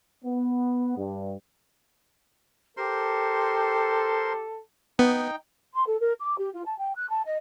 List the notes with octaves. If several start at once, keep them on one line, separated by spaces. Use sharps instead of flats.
B3
G2
G4 A4 A#4 C5 C6
B3 D#4 G5
C6
A4
A#4
D6
G4
F4
A5
G5
F#6
A5
D#5